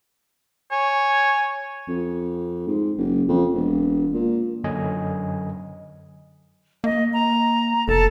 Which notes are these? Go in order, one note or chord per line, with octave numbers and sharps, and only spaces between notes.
C#5 G#5
F2
G#2
F#1
F2
E1
A#2
F#2 D3 F#3 D#5 G#5
A#3 D#5
A#5
F1 A4 A5